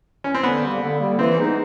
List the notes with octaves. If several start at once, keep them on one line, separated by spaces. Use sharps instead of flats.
C#4
C4
D3 B3
G3 A#3
D3
G3 A#3
E3 C4
G#3 B3 D#4